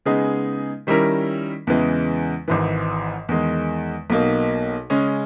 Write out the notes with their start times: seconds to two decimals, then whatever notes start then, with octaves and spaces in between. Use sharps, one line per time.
0.06 C#3 G#3 B3 D#4 G#4
0.87 D#3 G3 C#4 E4 A#4
1.67 E2 C#3 E3 G#3
2.48 G#1 G#2 E3
3.29 E2 D#3 G#3
4.10 B1 B2 A#3 D#4
4.90 C#3 G#3 C#4